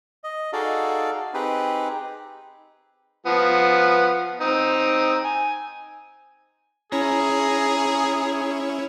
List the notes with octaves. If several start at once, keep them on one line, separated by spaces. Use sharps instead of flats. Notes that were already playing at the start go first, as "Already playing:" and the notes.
D#5
D#4 F#4 G#4 A4 D5 F5
C4 D#4 G4 G#4 B4
F3 B3
C4 D#4
G#5
C#4 E4 G#4 C#5 A#5